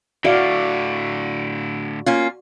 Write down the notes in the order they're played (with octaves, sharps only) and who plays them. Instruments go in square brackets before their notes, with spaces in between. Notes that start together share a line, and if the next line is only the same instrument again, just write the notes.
[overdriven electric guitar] A2 D3 [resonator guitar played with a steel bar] E4 [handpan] F#4 D5 F5
[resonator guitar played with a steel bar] A#3 C#4 F4